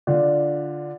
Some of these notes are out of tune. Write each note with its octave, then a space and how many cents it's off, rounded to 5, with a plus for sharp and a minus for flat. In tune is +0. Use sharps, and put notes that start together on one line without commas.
D3 -5 D4 +0 F4 +0